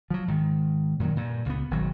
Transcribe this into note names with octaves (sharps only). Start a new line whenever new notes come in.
F3 F#3
G#2 D#3
F#2 A#2 D#3 F#3
G2 A#2
C#2 B3
G#1 B2 F#3